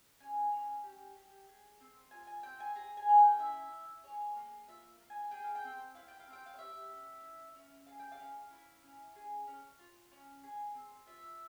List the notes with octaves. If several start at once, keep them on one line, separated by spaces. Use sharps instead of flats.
C#4 G#5
C#4
G4
G4
G#4
C4
F4 G#5
G#5
C4 G5
G#5
G#4 A#5
G#5
C#4
G5
E4 E5
C#4
G#4 C#5
A#3
F4 E5
A#3
G#5
G#4 G5
F5
G5
C4
E4 F5
G5
F5
C4
G5
F5
C#5
G4 E5
C#4
E4
C#4
G#4 F5
G5
F5
C#4
E4
C#4
G#4
C#4
F4
C#4
G#4
C4
F4 E5